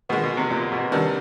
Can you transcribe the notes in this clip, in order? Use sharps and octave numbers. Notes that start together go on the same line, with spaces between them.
B2 D#3 G#3 B3
B2
C3
A#2
B2
C3 D#3 G3 B3 D4